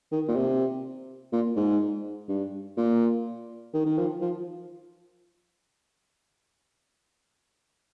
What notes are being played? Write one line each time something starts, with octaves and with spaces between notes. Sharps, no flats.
D#3
A#2
C3
A#2
G#2
G2
A#2
D#3
D#3
F3
F3